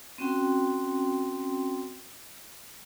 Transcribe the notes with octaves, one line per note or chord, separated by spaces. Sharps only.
C4 C#4 F#4 G5 C6